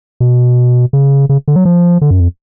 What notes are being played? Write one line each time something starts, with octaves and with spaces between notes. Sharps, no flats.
B2
C#3
C#3
D3
F#3
F3
D3
F#2
F2